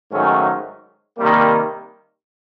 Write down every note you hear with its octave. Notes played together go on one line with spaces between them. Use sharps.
G#2 D#3 F#3 A3 C#4
C3 D#3 G3 A#3